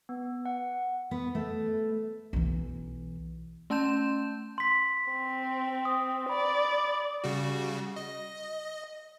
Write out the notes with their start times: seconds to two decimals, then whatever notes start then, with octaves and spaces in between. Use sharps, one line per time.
0.09 B3
0.45 F#5
1.11 B3
1.35 A3
2.33 B1 E3
3.70 A3 C#4 A5 C6 G6 E7
4.58 C6 B6
5.11 C4
5.85 D#6
6.29 D5 B5
7.24 C#3 G3 F#4
7.96 D#5